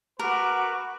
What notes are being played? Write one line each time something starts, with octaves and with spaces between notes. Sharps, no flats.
F#4 A#4 B4 C#6 D6